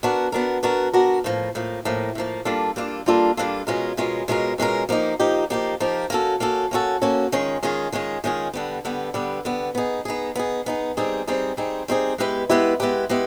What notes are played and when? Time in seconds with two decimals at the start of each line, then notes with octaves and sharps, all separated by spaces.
0.03 B3 D4 F#4 A#4
0.32 B3 D4 F#4 A#4
0.63 B3 D4 F#4 A#4
0.93 B3 D4 F#4 A#4
1.24 A2 F3 A#3
1.55 A2 F3 A#3
1.85 A2 F3 A#3
2.15 A2 F3 A#3
2.45 G3 A#3 D4 F4 A4
2.76 G3 A#3 D4 F4 A4
3.06 G3 A#3 D4 F4 A4
3.37 G3 A#3 D4 F4 A4
3.67 B2 G#3 C#4 F4 A#4
3.97 B2 G#3 C#4 F4 A#4
4.28 B2 G#3 C#4 F4 A#4
4.58 B2 G#3 C#4 F4 A#4
4.89 F3 A#3 D#4 G4
5.20 F3 A#3 D#4 G4
5.50 F3 A#3 D#4 G4
5.80 F3 A#3 D#4 G4
6.10 A#3 C#4 F#4 A4
6.40 A#3 C#4 F#4 A4
6.71 A#3 C#4 F#4 A4
7.02 A#3 C#4 F#4 A4
7.32 D#3 G#3 C#4 F4 G#4
7.63 D#3 G#3 C#4 F4 G#4
7.92 D#3 G#3 C#4 F4 G#4
8.24 D#3 G#3 C#4 F4 G#4
8.53 D3 G3 B3
8.85 D3 G3 B3
9.14 D3 G3 B3
9.45 D3 G3 B3
9.75 B3 D#4 G#4
10.05 B3 D#4 G#4
10.35 B3 D#4 G#4
10.66 B3 D#4 G#4
10.97 G3 C4 D#4 G#4
11.27 G3 C4 D#4 G#4
11.57 G3 C4 D#4 G#4
11.88 G3 C4 D#4 G#4
12.18 G#3 B3 E4 G4 B4
12.50 G#3 B3 E4 G4 B4
12.80 G#3 B3 E4 G4 B4
13.09 G#3 B3 E4 G4